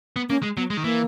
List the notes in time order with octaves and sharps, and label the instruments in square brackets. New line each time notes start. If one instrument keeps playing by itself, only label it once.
[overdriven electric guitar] B3
[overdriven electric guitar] A#3 [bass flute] C#4
[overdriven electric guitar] G#3
[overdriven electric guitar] F#3 [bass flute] B3
[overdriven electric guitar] G#3
D#3
[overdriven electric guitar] E3 [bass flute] A#3